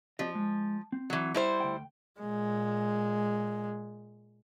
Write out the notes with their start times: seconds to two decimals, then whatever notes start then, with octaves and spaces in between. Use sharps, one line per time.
0.19 F3 C4 G4 D#5
0.35 G#3
0.92 C4
1.10 E3 F#3
1.34 G3 E4 C5
1.60 D2 G5
2.20 A#2 G#3